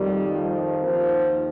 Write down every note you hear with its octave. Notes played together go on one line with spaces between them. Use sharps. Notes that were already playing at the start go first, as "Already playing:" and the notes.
Already playing: F2 D#3 G3
F3
D#2 D#3 F3